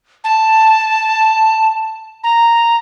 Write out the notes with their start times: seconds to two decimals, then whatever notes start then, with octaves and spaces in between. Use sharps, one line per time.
0.24 A5
2.24 A#5